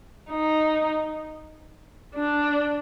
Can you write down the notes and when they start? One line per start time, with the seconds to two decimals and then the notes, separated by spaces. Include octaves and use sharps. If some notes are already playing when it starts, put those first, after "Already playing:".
0.30 D#4
2.15 D4